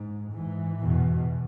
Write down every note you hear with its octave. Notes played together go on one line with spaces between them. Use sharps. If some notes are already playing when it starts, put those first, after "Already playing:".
Already playing: G#2
G#2 E3
E2 B2